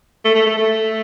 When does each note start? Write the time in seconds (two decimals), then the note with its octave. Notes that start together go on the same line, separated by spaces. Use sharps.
0.25 A3
0.35 A3
0.47 A3
0.57 A3